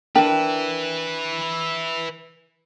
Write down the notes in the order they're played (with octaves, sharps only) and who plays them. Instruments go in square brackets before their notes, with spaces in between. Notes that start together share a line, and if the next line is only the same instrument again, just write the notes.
[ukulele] D4 A#4 G5 [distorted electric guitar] B4 E5